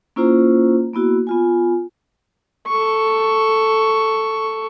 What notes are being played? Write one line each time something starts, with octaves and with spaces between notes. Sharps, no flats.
A#3 C#4 E4 F4 C5 A#5
A#3 B3 E4 F#4
B3 F4 G#5
A4 C#6